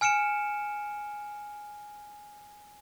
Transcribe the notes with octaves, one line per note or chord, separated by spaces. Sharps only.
G#5 F6 C#7 D7 E7